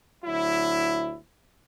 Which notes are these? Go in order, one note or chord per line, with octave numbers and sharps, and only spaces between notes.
D2 F#3 E4